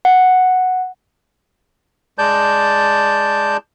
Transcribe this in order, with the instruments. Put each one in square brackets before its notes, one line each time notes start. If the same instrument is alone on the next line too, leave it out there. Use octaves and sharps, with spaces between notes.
[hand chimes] F#5
[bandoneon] G#3 D5 A5 G6